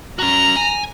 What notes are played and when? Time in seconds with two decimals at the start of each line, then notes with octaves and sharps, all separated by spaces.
0.19 C#4 F#4 A#5
0.56 G#5